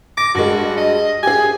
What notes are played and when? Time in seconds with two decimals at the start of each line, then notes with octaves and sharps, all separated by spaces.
0.18 D6 A#6
0.35 G2 G#3 F#4
0.77 D#5
1.23 G4 G#4 G#5